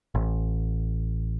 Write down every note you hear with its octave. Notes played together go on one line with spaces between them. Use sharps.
A1